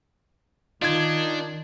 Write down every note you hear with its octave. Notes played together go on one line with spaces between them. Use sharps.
D#3 D4 D#4 F4 G#6